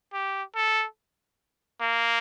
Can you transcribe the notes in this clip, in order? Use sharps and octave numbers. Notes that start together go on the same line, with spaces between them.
G4
A4
A#3